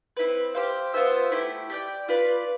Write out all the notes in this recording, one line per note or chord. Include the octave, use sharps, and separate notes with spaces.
C4 E4 B4
G4 C5 F5
B3 F4 C5 E5
A3 E4 G4
G4 D5 G5
F4 B4 D5